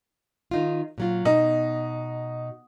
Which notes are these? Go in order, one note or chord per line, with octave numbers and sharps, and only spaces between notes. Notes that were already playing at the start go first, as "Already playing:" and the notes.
D#3 D#4 F4
A#2 F#3 F4
B2 D#4